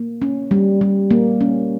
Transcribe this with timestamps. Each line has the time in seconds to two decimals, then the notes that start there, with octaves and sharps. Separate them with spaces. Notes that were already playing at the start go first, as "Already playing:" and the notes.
Already playing: A#3
0.22 C#4
0.51 G3
0.81 G3
1.11 A#3
1.41 C#4